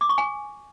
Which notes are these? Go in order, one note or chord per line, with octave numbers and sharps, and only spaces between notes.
D6
C#6
G#5